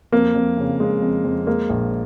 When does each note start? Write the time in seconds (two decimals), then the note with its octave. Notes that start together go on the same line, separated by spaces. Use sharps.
0.12 F2 A#3
0.35 F2
0.58 C#3
0.80 G#3
1.02 F2
1.25 F2
1.47 G#3 A#3
1.70 A#1